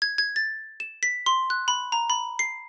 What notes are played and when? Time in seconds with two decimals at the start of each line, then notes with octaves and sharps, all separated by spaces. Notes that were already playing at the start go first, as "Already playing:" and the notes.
0.02 G#6
0.18 G#6
0.36 A6
0.80 E7
1.03 B6
1.26 C6
1.50 F#6
1.68 B5
1.92 A#5
2.10 B5
2.39 C7